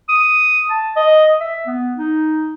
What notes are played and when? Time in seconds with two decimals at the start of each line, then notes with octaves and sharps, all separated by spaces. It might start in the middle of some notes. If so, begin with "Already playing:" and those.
0.09 D#6
0.70 A5
0.96 D#5
1.40 E5
1.67 B3
1.97 D#4